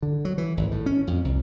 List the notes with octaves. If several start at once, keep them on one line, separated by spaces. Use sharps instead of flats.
D3
F#3
E3
G#1
A2
C#4
F2
C2